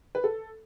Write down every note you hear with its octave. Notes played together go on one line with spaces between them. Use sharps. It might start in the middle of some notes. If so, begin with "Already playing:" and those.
B4
A4